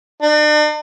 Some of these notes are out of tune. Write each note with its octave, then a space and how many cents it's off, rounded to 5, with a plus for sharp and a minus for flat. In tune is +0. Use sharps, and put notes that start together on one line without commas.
D4 +45